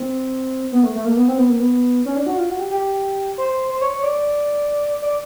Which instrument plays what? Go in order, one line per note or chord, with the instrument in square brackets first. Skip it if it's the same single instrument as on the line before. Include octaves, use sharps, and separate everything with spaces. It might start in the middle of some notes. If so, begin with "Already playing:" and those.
Already playing: [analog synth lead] C4
B3
A3
A3
A#3
B3
C4
B3
A#3
B3
C#4
D4
F#4
F4
F#4
G4
G4
C5
C5
C#5
C#5
D5
D5